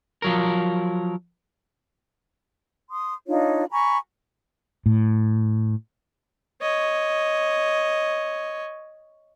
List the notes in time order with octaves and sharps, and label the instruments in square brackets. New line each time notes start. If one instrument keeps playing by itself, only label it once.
[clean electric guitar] F3 F#3 A#4
[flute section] C6 D#6
D4 D#4 F4 C#5
G#5 A#5 B5 C#6
[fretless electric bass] A2
[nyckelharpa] C#5 D#5